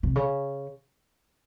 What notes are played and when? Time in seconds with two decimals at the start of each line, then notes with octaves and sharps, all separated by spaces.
0.03 C3
0.16 C#3